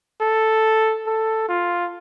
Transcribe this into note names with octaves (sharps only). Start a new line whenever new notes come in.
A4
A4
F4